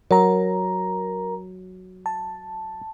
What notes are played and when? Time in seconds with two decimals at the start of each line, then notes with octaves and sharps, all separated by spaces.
0.11 F#3 A#4 A#5
2.06 A5